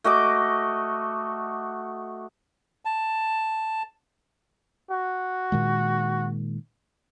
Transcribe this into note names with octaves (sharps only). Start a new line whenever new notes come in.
A3 F#4 D#5 D6
A5
F#4
A#2 D#3 G#3